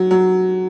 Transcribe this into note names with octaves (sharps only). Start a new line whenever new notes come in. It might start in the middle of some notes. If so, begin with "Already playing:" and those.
Already playing: F#3
F#3